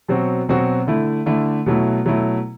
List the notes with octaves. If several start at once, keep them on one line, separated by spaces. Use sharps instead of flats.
B2 F#3 C4 F#4
B2 F#3 C4 F#4
D3 A3 E4
D3 A3 E4
B2 F#3 A3 E4
B2 F#3 A3 E4